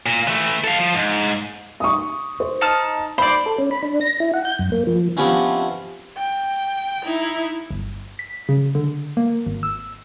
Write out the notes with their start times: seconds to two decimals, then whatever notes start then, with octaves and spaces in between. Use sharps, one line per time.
0.06 A#2
0.27 E3 A3
0.64 A4 F5
0.78 F3
0.94 G#2
1.80 C#6 D#6
2.40 C5
2.61 D#4 A5 F6
3.18 C5 D5 B5
3.46 A4
3.58 C#4
3.71 B5
3.83 D4
4.01 A#6
4.20 E4
4.34 F#5
4.45 G6
4.59 F#2
4.72 A#3
4.87 F3
5.17 C3 F3 B3 C#4 D4
6.17 G5
7.04 D#4 E4
7.71 G1
8.19 B6
8.49 C#3
8.75 D3
9.17 A#3
9.46 G#1
9.63 E6